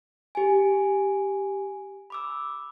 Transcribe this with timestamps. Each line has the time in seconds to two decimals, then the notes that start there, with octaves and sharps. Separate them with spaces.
0.35 G4 G#5
2.10 B5 D6 E6